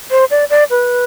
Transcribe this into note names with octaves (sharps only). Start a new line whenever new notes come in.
C5
D5
D5
B4